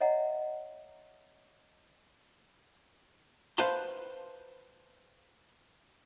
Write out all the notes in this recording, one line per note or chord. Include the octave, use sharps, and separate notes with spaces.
C#5 D#5 E5 F#5 A#5
B4 C5 F5 F#5 A5 C6